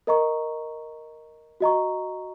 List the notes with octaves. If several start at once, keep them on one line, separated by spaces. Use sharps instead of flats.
A#4 D#5 A#5 C#6
F#4 D#5 A#5 C#6